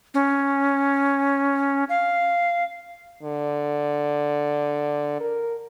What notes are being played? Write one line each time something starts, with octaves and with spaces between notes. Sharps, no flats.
C#4
F5
D3
A#4